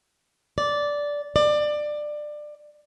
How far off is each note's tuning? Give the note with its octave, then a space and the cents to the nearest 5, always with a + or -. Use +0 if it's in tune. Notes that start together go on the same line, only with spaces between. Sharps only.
D5 -10
D5 +20